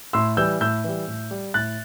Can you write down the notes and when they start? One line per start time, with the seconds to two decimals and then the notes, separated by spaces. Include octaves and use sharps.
0.13 A2 C6 E6
0.37 E3 G3 E6 G6
0.61 A2 E6 G6
0.84 E3 G3
1.08 A2
1.31 G3
1.54 A2 F#6 A6